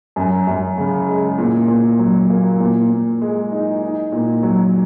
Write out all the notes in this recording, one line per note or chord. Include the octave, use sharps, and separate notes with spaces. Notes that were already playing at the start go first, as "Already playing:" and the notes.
F#2
F#2
C#3
G#3
A#2
A#2
F#3
A#3
A#2
A#2
G#3
D#4
D#4
A#2
F#3